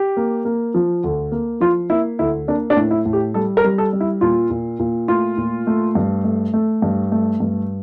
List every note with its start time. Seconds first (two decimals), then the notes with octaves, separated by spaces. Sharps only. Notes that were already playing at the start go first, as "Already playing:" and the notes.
Already playing: G4
0.17 A#3
0.45 A#3
0.74 F3
1.04 D2
1.32 A#3
1.60 F3 F4
1.90 A#3 E4
2.19 D2 E4
2.48 A#3 D4
2.70 D4
2.76 A2
2.91 E4
3.05 A2
3.13 G4
3.34 G3 A4
3.57 A#4
3.64 G3
3.78 A4
3.93 G3
4.00 E4
4.21 A#2 F4
4.50 A#2
4.79 A#2
5.08 A3 F4
5.38 A#2
5.67 A3
5.95 G2
6.24 A3
6.54 A3
6.82 G2
7.12 A3
7.40 G2